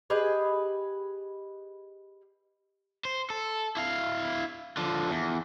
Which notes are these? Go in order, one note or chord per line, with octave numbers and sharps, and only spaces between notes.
G4 G#4 B4 D#5
C5
A4
E4 F5
D3 F3
E2